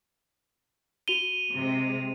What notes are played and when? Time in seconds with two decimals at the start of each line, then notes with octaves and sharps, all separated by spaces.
1.08 F#4 D#7 F7 G7
1.53 C3 G#3